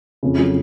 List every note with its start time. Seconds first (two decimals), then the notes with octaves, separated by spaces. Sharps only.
0.23 F2 C#3
0.39 F#3